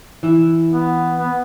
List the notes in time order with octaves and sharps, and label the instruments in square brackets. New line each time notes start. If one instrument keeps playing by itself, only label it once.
[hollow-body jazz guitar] E3 E4
[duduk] B3
B3